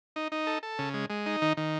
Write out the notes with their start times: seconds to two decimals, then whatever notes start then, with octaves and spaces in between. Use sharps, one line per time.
0.16 D#4
0.32 D#4
0.47 A4
0.63 A4
0.79 C#3
0.94 G#3
1.10 G#3
1.26 D#4
1.42 D#3
1.57 D#3